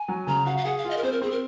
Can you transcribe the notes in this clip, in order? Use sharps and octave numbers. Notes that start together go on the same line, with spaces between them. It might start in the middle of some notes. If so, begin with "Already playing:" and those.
Already playing: G#5
F#3
C#3 A#5
F#4 F5
F5
G#4 F#5
F5
F4
D#5
A#4
C4 C5
A#4
C4 G#4
A#4